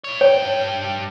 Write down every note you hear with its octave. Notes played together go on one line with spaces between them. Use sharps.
E4 C#5
G2 C#5 G5